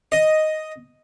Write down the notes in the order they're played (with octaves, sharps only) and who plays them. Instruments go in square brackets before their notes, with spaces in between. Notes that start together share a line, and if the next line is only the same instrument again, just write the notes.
[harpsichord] D#5